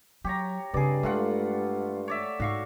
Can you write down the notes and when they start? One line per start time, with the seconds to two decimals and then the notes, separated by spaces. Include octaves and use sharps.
0.24 F#3 G4 C#5 A#5
0.74 G2 C#3 C4 G#4 D5
1.03 G#3 A3 F4 F#5
2.08 C#5 D5 E5
2.40 G#2 F#4 F5 C#6